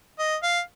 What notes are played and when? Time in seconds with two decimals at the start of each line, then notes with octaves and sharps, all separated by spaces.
0.19 D#5
0.43 F5